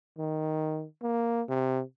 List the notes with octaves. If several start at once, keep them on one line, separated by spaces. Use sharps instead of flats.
D#3
A#3
C3